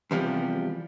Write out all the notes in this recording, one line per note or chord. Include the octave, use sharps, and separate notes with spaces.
E2 C3 F3 G3